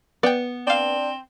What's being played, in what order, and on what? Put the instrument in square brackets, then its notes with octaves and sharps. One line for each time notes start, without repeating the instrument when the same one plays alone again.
[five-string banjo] B3 [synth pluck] D5 G5
[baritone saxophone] C4 [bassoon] D4 [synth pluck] D5 F5